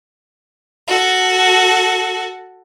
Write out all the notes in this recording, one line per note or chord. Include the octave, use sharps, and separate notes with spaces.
F#4 A4